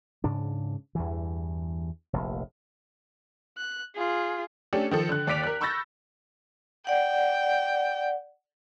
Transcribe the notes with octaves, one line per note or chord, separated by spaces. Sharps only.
G#2 C#3 D4
E2 G2 E3
F1 A#1
F#6
F4 G#4
A3 C#4 D4 G4 A4
D#3 F3 A4
D3 F#6
D#2 D5 D6 B6 D7 F7
A#4 F#6
B5 C#6 E6 G6 A6 A#6
D5 F#5 G5